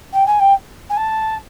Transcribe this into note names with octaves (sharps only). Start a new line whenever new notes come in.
G5
G#5
G5
G#5
A5